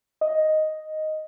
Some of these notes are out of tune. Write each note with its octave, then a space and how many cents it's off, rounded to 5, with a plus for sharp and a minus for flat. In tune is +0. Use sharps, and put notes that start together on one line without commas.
D#5 +0